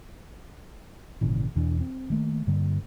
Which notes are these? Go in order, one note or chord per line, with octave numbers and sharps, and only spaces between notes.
G#1 A#2 C#3 E3
E2 B2 E3 D4
C4
D#3 A3 A#3
G2 D3 G3 A#3